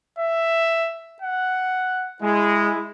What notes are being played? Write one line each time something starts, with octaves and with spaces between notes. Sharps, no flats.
E5
F#5
G#3 E4